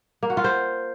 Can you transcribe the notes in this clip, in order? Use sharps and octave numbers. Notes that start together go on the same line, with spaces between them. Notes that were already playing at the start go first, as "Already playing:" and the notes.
A#3
F#4
F4
C5